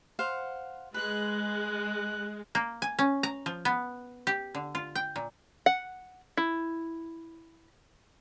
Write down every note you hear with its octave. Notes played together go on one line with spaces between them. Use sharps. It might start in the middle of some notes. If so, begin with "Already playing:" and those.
C5 F5 F#5
G#3 B4 F#6
A#3
G#5
C#4
A#5
F3
B3
G4
D3
F4
G5
A#2
F#5
E4